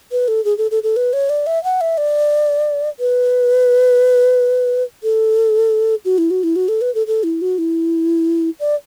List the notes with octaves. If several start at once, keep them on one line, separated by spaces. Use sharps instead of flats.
B4
A4
G#4
A4
A4
A4
B4
C#5
D5
E5
F#5
E5
D5
B4
A4
F#4
E4
F#4
E4
F#4
A4
B4
A4
A4
E4
F#4
E4
D5